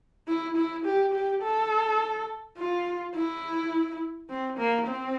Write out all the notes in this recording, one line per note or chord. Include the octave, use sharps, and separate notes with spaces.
E4
E4
G4
G4
A4
F4
E4
C4
A#3
C4